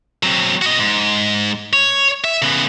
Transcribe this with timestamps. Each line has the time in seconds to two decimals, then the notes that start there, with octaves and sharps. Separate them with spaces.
0.23 F#3 C4
0.62 F#4 D#5
0.79 G#2
1.73 C#5
2.24 E5
2.42 C#3 B3